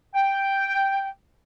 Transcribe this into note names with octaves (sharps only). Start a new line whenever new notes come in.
G5